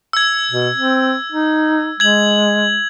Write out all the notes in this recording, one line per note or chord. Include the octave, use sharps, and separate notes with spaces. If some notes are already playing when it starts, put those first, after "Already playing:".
E6 G#6
B2
C4
D#4
G#3 G#6 F#7